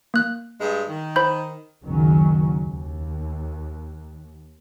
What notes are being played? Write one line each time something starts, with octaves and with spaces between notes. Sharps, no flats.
A#3 F#6
G2 G#3
D#3
C5 B5 G6
F#1 C#2 D#3 F#3 C#4
D#2